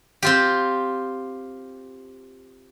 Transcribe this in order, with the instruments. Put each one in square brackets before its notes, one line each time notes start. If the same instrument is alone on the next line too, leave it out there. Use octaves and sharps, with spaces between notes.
[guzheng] C4 F4 G4